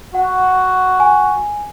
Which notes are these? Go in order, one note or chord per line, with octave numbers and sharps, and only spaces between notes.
F#4 F#5
G#5